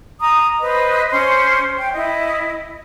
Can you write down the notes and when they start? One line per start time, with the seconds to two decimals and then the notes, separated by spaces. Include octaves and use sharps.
0.21 A#5 D#6
0.59 B4 C5 D#5
1.11 C#4 C5 C6
1.78 G5
1.94 E4 D#5